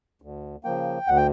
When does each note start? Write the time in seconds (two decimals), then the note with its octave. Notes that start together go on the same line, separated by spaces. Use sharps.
0.22 D2
0.64 C#3 F3 A#3 G5
1.07 D2 F#5
1.17 G5